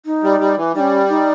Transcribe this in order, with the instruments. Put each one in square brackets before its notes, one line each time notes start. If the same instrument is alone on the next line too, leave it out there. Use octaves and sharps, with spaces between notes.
[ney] D#4
[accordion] G3
G3
E3
[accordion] G3 [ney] D#4
[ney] C#4
D#4